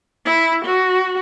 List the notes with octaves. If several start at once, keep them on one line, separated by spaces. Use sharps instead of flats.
E4
F#4